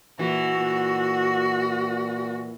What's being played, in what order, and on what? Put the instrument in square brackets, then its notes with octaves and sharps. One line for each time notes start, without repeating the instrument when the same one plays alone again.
[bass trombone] A#2 [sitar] E3 [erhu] F#4
[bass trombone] A#2